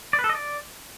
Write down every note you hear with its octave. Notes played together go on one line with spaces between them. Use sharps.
D5
B4
A4
D#5
D5